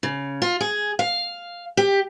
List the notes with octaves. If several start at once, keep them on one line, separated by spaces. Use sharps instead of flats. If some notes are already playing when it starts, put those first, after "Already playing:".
C#3
F4
G#4
F5
G4